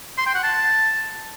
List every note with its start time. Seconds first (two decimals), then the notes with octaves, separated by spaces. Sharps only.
0.18 C6
0.26 G5
0.35 F#5
0.43 A5